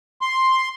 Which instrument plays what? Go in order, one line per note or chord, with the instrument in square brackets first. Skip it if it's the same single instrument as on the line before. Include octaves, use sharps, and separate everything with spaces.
[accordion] C6